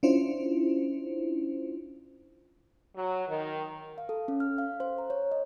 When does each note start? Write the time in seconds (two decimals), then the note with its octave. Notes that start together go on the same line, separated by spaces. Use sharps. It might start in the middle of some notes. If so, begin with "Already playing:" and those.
0.03 C#4 D4 E4 F4 C5
2.96 F#3
3.28 D#3
3.98 F5
4.09 A4
4.28 C#4
4.40 F6
4.58 F5
4.80 C5
4.98 A#5
5.10 C#5
5.32 D#5